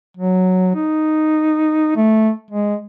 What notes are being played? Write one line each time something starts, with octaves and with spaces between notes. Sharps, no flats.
F#3
D#4
A3
G#3